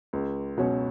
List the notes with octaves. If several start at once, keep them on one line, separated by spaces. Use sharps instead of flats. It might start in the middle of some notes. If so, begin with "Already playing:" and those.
C#2
B2 F#3 C#4